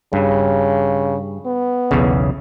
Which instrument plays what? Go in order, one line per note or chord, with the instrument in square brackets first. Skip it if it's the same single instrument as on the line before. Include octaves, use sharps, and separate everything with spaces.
[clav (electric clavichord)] G2 [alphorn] C#3
[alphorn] B3
[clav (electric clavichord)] B1 E2 C#3